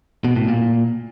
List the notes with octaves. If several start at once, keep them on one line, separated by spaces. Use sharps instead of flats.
B2
A2
A#2